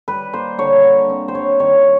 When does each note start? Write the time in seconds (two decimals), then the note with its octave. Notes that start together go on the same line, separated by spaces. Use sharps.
0.08 G3 B4
0.33 A#3 C5
0.58 D3 C#5
0.84 D3
1.09 C4
1.28 C5
1.35 G3 C#5
1.60 D#3 C#5